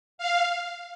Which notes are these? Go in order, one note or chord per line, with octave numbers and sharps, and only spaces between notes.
F5